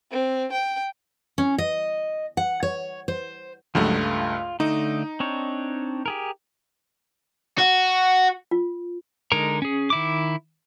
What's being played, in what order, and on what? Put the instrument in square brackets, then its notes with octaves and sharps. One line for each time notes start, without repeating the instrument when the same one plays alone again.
[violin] C4
G5
[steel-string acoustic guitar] C#4
D#5
F#5
C#5
C5
[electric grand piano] C#2 G2 A3 [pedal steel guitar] F3 F#3 G#3
[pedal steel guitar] F4
[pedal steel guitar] D3 A3 D#5 [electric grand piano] D#4
[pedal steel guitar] C4 D4 C#5
G4 G#4 A#4
[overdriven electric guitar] F#4
[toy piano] F4
[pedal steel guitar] D3 G#3 D#4 A#4 A#5
C#4 G#4
D#3 E4 D6